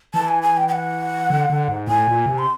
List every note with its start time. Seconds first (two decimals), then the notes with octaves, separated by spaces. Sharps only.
0.14 E3 A5
0.28 G#5
0.43 G#5
0.57 G5
0.68 G5
0.72 F#5
1.30 D3
1.50 D3
1.68 G#2
1.87 A2 G#5
2.08 A#2
2.26 C3
2.38 C6